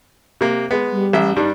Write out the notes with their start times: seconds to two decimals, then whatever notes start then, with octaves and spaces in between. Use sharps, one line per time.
0.41 C3 A#3
0.71 G#3 B3
0.91 G3
1.13 A1 E5
1.36 G2 G3 D4 D#4